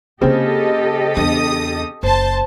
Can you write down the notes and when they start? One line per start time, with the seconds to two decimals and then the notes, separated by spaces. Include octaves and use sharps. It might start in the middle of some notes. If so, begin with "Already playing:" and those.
0.21 C#3 A#3 C4 F4 G4 A4 D#5
1.17 E2 D4 D#6
2.03 F#1 C5 A5